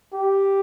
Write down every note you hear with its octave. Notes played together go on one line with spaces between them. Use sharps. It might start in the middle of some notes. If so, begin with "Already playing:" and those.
G4